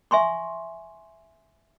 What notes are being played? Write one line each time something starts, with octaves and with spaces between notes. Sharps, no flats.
E5 G#5 C6 C#6